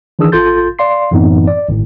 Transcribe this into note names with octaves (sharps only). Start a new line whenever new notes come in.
D#3 E3 D4 G#4 D#6 E6
G#1 F4 A4 C6 G6 A6
D5 F5 C6 C7
F#2 A2 E3 B3 C4 D#4
D5
G#1 A2